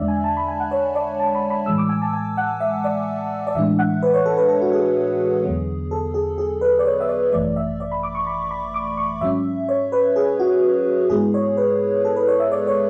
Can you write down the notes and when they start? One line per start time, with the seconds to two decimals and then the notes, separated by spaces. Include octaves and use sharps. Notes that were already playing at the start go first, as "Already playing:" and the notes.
Already playing: E2 D3 G#3 D4 D5 E5
0.08 G#5
0.24 A5
0.37 B5
0.48 G#5
0.60 F#5
0.71 C#5
0.95 D5
1.20 A5
1.35 B5
1.50 B5
1.66 A2 E3 G#3 E6
1.78 D6
1.89 G#5
2.02 A5
2.13 G#5
2.37 F#5
2.60 E5
2.84 D5
3.47 D5
3.55 A2 E3 G#3 D4 E5
3.79 F#5
4.03 B4
4.14 C#5
4.26 A4
4.38 B4
4.49 A4
4.62 F#4
4.73 G#4
5.44 E2 D3 F#3 B3
5.91 A4
6.14 G#4
6.38 G#4
6.61 B4
6.79 D5
6.85 C#5
7.00 E5
7.09 D5
7.32 G#1 F#2 E3 A3 D5
7.56 E5
7.80 D5
7.92 B5
8.03 D6
8.15 C#6
8.27 B5
8.51 B5
8.74 D6
8.97 C#6
9.21 G#2 F#3 C#4 E5
9.69 C#5
9.92 B4
10.16 G#4
10.39 F#4
11.10 G#2 G#3 B3 E4 G#4
11.34 C#5
11.57 B4
12.05 A4
12.16 B4
12.28 C#5
12.40 E5
12.52 D5
12.67 C#5